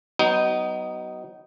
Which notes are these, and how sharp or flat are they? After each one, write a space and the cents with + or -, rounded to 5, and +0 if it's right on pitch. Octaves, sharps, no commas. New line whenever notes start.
F#3 +30 B3 +5 D#4 +0